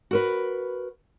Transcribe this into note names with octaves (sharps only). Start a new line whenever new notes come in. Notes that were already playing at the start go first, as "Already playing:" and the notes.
F#4 A#4 B4